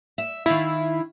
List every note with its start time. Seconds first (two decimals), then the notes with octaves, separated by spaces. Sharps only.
0.18 E5
0.46 D#3 E4 F4